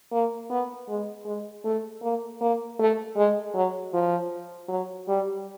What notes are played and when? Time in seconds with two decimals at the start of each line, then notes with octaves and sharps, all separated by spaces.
0.12 A#3
0.50 B3
0.88 G#3
1.26 G#3
1.65 A3
2.03 A#3
2.41 A#3
2.79 A3
3.16 G#3
3.54 F#3
3.93 F3
4.69 F#3
5.08 G3